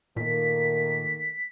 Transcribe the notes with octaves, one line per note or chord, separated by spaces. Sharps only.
A#2 D#3 A3 A#3 B6